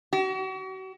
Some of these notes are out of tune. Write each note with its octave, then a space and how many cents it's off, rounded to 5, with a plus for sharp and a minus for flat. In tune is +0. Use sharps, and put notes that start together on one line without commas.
F#4 +40